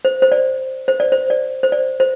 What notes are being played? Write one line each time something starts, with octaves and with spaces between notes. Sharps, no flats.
C5
C5
D5
C5
D5
C5
D5
C5
D5
C5